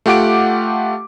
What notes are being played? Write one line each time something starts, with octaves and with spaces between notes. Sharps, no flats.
A3 F4 G4 F#5 D6 D7